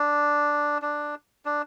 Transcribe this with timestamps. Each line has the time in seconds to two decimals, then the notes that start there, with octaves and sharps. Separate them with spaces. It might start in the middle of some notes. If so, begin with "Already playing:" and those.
Already playing: D4
0.82 D4
1.45 D4